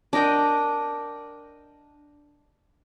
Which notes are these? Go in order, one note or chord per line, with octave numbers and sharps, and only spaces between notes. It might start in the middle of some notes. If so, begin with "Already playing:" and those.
D4 A#4 D#5 G5